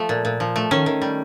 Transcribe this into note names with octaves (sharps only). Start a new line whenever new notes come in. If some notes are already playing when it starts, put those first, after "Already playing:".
Already playing: F3 A3
A#2
A#2
F3
A3
D#3 C#4
D#3
G3